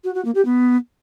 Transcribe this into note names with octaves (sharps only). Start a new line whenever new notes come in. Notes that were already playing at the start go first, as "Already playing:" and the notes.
F#4
F#4
A#3
G4
B3